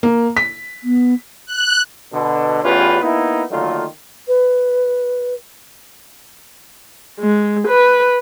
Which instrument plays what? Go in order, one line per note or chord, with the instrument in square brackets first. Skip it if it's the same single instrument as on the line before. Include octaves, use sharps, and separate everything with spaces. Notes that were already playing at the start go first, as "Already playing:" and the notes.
[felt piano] A#3
B6
[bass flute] B3
[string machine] F#6
[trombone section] B2 D3
A1 E2 C#4 F4 G4 B4
A#3 B3 D#4 E4
D3 D#3 F#3 A3 A#3 F4
[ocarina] B4
[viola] G#3
B4